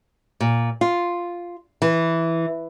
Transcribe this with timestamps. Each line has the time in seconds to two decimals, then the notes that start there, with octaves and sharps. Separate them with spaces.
0.40 A#2
0.81 F4
1.82 E3